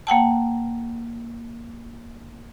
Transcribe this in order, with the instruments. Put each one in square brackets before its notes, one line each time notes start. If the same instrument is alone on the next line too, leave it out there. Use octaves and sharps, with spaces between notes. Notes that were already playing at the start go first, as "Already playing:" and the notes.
[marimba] A#3 F#5 G5 A5